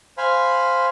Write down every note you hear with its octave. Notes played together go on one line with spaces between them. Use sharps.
C5 F5 G#5 B5